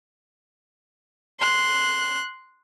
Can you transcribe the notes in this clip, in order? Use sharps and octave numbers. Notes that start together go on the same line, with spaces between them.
C6 F#6